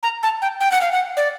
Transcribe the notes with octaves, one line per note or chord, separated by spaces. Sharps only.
A#5
A5
G5
G5
F#5
F5
F#5
D5